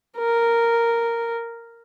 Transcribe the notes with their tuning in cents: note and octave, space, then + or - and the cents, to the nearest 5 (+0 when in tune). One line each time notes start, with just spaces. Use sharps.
A#4 -5